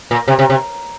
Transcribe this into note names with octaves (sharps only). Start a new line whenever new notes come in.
A#2
C3
C3
C3